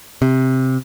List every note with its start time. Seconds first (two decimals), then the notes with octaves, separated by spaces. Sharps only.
0.22 C3